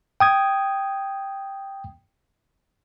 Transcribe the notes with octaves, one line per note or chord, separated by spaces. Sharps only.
G5 D#6 G#6